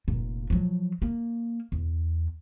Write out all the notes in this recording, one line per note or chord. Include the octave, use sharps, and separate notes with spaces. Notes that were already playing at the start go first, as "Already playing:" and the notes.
F1 A#2
F3 F#3
A#3
E2